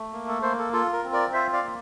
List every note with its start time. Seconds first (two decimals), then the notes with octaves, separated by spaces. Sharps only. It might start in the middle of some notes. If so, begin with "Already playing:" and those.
Already playing: A3
0.13 A#3
0.28 A4
0.42 A#3 A4 C5
0.58 A4
0.73 F4 A4
0.93 A#4
1.04 C4
1.13 A#4 D5
1.33 F4 C5 E5
1.53 D5 F5
1.63 A#3